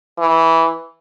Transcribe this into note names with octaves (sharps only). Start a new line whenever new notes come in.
E3